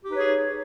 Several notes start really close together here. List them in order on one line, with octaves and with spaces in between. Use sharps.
G4 D#4 B4 C#5 G#4